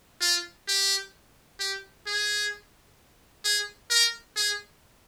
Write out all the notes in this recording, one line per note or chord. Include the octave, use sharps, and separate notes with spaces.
F4
G4
G4
G#4
G#4
A#4
G#4